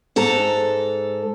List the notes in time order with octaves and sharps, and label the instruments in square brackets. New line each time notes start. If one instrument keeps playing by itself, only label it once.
[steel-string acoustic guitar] G#2 A4 A#5